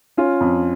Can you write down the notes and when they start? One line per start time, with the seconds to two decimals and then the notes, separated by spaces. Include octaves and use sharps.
0.17 C#4 F4
0.41 F2